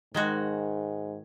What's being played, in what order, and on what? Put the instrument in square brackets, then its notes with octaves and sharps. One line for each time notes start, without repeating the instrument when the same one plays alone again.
[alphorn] G#2 [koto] D#3 G#3 F#4